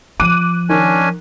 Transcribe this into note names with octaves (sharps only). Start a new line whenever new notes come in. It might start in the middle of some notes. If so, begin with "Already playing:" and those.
F3 D6 F#6 D#7
D#3 C#4 D4 G#5